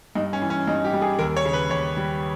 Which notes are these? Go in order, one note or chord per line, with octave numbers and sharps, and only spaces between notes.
G2 D#4
C#4
E3
C#4
G2 D#4
G4
G3
G#4
D#2 A#4
C#5
C#3
B4
D#2 C#5
G3